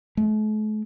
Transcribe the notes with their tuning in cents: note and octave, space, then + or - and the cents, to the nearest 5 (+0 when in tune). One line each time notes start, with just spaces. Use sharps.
A3 -45